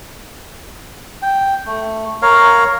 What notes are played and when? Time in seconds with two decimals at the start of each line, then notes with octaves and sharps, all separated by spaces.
1.22 G5
1.66 A3
2.22 A#4 C#5 F5